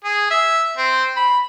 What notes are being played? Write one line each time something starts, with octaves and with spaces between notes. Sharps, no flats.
G#4
E5
C4
B5